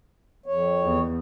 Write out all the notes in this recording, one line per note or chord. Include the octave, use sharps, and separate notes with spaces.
F2 C#5
E2